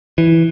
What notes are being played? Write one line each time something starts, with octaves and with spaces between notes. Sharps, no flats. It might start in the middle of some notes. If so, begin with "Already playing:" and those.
E3